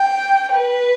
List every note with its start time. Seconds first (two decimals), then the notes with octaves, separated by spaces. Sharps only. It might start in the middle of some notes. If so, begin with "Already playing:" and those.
Already playing: G5
0.53 B4